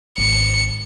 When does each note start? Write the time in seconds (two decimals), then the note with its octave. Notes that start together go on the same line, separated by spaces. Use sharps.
0.18 G#1 C#7